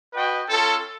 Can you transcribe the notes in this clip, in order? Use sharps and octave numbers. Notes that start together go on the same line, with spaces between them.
F#4 B4 D#5 G5
C#4 F4 A4